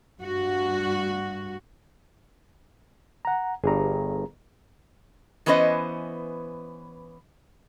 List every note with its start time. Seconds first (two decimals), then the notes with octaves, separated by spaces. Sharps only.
0.21 G2 F#4
3.25 F#5 A#5
3.64 G1 G2 G#4 A#5
5.46 E3 B3 C#4 B4 C5 D#5